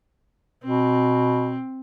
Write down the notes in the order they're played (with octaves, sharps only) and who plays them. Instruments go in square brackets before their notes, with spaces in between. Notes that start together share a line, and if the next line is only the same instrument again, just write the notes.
[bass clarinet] B2 [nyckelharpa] C4